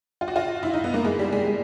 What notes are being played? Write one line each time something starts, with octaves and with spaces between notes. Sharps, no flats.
F4
F#4
F4
E4
D#4
B3
A#3
G#3
G3
G#3
G#3